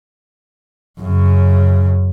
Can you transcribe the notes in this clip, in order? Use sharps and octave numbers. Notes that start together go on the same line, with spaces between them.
F#2 C#3